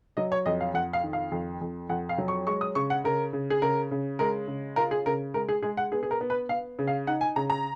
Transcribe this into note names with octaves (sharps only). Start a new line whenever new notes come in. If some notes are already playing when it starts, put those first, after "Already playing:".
F#3 D#5
C#5
F2 D#5
F5
F2 F#5
F5
D#3
F5
F2
F2
F2 F#5
F5
F#3
C#6
G#3 C#6
D#6
C#3 C#6
F#5
C#3 A#4
C#3
G#4
C#3 A#4
C#3
G#3 A#4
C#3
F4 A#4
G#4
C#3 A#4
G#3 A#4
G#4
G#3 G#4
F#5
B3 G#4
G#4
A#4
B3
B4
B3 F5
C#3
F5
D#4 F#5
G#5
C#3 A#5
A#5